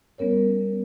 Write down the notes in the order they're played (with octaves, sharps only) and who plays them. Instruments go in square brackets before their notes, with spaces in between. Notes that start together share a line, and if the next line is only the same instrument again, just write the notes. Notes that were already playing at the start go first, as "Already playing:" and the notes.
[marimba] G3 B3 C#4 A#4 C#5